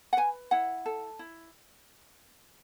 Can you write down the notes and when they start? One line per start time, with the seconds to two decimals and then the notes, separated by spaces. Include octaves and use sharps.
0.13 F#5
0.17 B4 G#5
0.51 E4 F#5
0.86 A4
1.19 E4